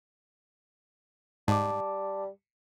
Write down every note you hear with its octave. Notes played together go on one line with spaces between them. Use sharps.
G#2 G3 A5 D6